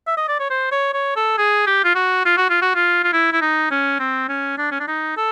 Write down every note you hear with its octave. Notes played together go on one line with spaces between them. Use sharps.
E5
D#5
D5
C#5
C5
C#5
C#5
A4
G#4
G4
F4
F#4
F4
F#4
F4
F#4
F4
F4
E4
E4
D#4
C#4
C4
C#4
D4
C#4
D4
D#4
A4